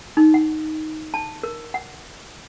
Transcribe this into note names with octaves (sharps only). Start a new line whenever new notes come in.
D#4
F#5
A5
A#4
F#5